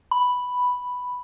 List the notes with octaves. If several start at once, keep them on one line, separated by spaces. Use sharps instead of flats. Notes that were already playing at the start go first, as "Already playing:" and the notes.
B5